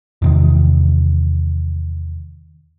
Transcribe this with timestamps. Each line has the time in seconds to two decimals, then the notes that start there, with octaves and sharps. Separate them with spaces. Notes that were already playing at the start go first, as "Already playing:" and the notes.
0.22 E2 C3 D#3